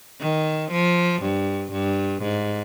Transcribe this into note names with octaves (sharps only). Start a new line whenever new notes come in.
D#3
F3
G2
G2
G#2